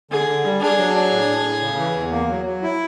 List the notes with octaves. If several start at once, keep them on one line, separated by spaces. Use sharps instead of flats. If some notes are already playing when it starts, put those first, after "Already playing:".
D3 G#4
D3
G3
D4 G#4
F#3
D4
A2
A2
A2
C#3
E3
E2
A#3
F#3
F#3
E4